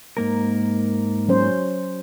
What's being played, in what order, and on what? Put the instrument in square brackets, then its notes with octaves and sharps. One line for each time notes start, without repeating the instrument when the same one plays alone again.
[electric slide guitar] G#2 A#3 A#4
[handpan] F#3 C#4 C5